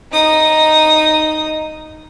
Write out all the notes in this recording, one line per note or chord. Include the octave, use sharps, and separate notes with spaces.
D#4 D#6